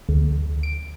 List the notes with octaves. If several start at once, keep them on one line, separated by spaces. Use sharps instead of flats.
D2
D7